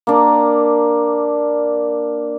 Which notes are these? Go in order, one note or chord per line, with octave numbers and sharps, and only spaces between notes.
A#3 D4